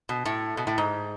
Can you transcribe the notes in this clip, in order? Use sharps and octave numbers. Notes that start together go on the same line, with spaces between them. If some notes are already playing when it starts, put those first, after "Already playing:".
B2
A2
B2
A2
G#2